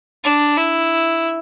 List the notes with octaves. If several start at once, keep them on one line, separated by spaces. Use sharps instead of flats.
D4
E4